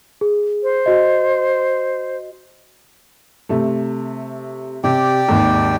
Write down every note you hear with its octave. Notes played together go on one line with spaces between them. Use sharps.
G#4
C5
F#4 D#5
C3 A3
C3 G4 D5 G5
G#1 D#2